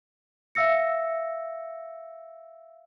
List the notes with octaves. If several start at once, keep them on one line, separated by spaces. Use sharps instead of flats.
E5 F5 E6 A#6 C#7